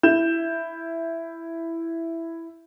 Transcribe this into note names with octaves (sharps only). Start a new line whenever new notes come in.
E4 G6 E7